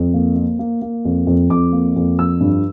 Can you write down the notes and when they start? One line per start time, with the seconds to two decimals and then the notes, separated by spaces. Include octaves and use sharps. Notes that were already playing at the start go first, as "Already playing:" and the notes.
Already playing: F2
0.14 A#3
0.36 A#3
0.59 A#3
0.82 A#3
1.05 F2
1.27 F2
1.50 F2 D6
1.72 A#3
1.96 F2
2.18 F3 E6
2.41 G2